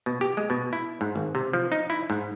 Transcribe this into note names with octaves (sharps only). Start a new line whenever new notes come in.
B2
G4
G#3
B2
E4
G#2
G#1
C3
F3
D#4
E4
G#2